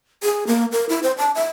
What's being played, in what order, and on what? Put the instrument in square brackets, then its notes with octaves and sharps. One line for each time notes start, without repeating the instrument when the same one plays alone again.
[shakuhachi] G#4
A#3
A#4
E4
C5
A5
E5